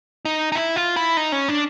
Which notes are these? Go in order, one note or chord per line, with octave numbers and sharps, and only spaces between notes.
D#4
D#4
E4
F4
E4
D#4
C#4
D4